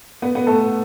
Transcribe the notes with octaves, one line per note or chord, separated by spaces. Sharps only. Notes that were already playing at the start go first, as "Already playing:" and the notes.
B3 B4
B3 B4
A3 A4